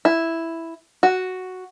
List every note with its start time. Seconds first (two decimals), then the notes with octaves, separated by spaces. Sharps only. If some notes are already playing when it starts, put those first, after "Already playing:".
0.05 E4
1.03 F#4